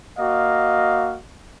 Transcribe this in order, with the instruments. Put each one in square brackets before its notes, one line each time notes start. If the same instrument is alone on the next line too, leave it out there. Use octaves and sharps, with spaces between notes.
[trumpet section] A#3 F#4 D#5 F5